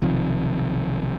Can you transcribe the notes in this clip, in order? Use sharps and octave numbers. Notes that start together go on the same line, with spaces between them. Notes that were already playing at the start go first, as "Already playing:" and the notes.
B1 C3 D#3 F3